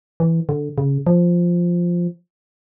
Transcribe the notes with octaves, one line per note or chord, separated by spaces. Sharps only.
E3
D3
C#3
F3